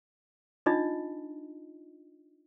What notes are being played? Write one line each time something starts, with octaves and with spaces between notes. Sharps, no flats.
D4 D#4 F4 D#5